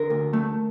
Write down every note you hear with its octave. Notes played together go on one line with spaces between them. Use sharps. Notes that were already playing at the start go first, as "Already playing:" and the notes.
Already playing: D3 A#4
D2
A3